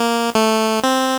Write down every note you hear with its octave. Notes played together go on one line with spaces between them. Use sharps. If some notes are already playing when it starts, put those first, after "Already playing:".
Already playing: A#3
A3
C4